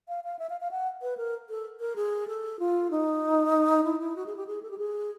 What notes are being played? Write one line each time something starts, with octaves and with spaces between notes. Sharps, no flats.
F5
F5
E5
F5
F5
F#5
B4
A#4
A4
A#4
G#4
A4
F4
D#4
E4
E4
F#4
G#4
G4
G#4
A4
G4
G#4